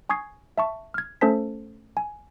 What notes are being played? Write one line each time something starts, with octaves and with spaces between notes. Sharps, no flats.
G#5 C#6 D#6 G#6 C7
E5 A5 C#6
F6 G#6
A3 C#4 A4 C5 A5 B6
G#5